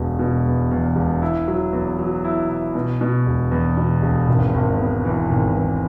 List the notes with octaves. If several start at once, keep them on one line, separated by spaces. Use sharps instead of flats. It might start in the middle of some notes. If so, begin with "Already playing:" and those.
Already playing: E1 B2
B2
E2
E2
E1
E4
F#3
E2
F#3
E4
E4
B2
B2
E1
E2
B2
E1
G#1
G#1
B3
E3
G#1
E3